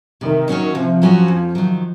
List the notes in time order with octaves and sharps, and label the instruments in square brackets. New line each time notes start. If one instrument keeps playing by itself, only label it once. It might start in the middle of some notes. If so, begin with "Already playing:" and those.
[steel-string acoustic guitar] C3 [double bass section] D#3
[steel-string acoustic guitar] F#3 C#4 F#4 C#5
[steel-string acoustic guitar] C3 [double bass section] F3
[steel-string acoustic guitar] F#3 C#4 F#4 C#5
F2
D#3 F#3